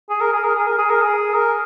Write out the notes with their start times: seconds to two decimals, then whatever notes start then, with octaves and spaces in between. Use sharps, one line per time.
0.09 G#4
0.21 A#4
0.33 G#4
0.44 A#4
0.55 G#4
0.66 A#4
0.78 G#4
0.90 A#4
1.02 G#4
1.34 A#4